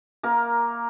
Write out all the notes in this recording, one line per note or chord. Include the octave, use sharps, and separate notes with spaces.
A#3 A#4